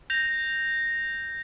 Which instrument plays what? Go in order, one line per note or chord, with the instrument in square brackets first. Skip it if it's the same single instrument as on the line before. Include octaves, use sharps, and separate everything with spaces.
[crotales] G6 A#6 F7